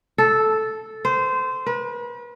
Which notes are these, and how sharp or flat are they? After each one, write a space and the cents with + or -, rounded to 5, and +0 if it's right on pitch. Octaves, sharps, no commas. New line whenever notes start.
A4 -5
C5 -20
B4 -40